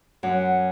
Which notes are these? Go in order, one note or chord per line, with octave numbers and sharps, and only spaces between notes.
F#2 F#5